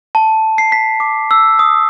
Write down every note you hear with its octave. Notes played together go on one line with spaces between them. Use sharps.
A5
C7
B6
D6
E6
D#6